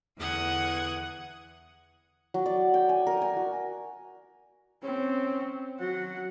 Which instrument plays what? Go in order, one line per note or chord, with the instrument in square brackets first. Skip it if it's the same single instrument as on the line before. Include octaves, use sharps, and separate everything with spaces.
[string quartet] E2 D3 E3 F#5 D#6 G#6
[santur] F#3
D5
G5
G#5
A#4
G#5
F#4
[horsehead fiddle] C4 [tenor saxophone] C#4
[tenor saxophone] F#3 [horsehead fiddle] F#5